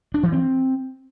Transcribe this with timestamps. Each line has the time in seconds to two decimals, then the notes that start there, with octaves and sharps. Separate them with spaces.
0.14 D4
0.23 E3
0.32 C4